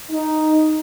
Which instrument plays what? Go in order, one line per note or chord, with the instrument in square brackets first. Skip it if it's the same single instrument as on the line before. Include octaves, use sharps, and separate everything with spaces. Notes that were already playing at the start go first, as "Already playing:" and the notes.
[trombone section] D#4